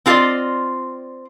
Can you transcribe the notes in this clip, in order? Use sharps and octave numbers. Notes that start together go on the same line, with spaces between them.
C4 F4 G4 A4 D5 D#5